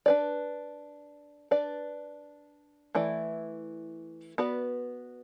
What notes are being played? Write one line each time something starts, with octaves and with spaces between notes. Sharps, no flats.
D4 B4 D5
D4 B4 D5
E3 A3 E4 D5
B3 F#4 B4 D5